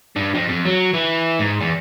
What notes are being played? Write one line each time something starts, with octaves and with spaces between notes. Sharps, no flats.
G2
F2
F2
F#3
E3
G#2
E2